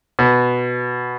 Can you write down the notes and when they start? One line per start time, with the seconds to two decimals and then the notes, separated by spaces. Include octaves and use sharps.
0.19 B2